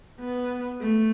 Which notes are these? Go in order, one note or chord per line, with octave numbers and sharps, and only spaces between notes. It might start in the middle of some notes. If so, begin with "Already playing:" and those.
B3
A3